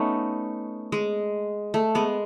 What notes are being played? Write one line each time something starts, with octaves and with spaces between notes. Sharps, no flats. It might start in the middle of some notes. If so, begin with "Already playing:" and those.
Already playing: A3 B3 C#4 D#4
G#3
A3
G#3 B3